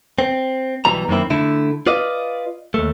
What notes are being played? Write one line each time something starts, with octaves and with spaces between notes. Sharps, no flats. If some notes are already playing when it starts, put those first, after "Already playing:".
C4
B1 B2 E3 G3 A#5
F#2 D#3 A#3 C4 E4
D3 A3 E4
F4 B4 D5 D#5 F5
D#2 A3